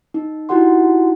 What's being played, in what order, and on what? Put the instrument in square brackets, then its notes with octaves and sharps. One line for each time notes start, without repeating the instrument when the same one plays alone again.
[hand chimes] D#4
D#4 E4 F#4 G4 F#5 C6